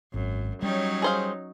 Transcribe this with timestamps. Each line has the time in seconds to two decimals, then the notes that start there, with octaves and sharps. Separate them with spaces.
0.14 G#1 F#2
0.62 F#3 G3 C#4 D#4
1.02 G#4 C5 F5